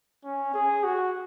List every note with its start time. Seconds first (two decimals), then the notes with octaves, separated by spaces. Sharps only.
0.24 C#4
0.54 G#4
0.84 F#4